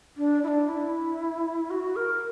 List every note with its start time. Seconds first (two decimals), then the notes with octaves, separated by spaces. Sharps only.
0.17 D4
0.43 E4
0.48 D4
0.69 E4
1.70 F#4
1.96 A#4